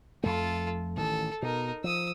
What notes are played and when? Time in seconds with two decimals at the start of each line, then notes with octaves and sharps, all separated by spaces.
0.24 F2 A3 F4 A4
0.97 A1 D#3 A4
1.42 B2 D#4 A#4
1.84 F3 D#6 E6